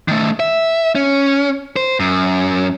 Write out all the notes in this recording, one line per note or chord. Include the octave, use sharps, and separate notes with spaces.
D#3 A3
E5
C#4
C5
F#2